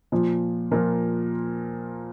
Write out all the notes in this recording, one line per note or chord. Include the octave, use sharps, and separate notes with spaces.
A#2 F3
A#2 F3 A#4